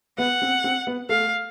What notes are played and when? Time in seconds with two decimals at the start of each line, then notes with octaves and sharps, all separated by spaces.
0.18 B3 F#5
0.42 C4
0.64 C4
0.87 B3
1.09 A3 F5